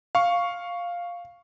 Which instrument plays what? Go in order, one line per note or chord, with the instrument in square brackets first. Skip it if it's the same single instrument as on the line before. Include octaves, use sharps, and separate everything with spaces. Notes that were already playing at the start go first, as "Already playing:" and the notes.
[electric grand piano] F5 C#6